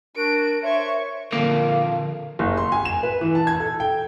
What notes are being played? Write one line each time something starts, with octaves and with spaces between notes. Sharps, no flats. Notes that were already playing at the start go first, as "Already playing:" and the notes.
D4 F#4 A#4 D7
C5 C#5 E5 C#6
F2 A#2 D3 A#3 F5
F#1
C6
G#5
E7
B4
E3
A5
G#6
A4
G5